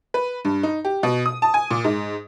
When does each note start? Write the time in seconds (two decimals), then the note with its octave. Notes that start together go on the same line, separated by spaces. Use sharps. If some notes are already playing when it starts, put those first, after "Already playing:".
0.14 B4
0.45 G2
0.63 D#4
0.85 G4
1.03 B2
1.26 D#6
1.42 A5
1.54 G#5
1.71 A#2
1.84 G#2